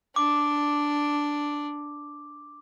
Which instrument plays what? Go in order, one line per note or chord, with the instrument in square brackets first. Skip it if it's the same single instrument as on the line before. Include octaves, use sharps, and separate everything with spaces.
[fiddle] D4 [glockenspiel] D6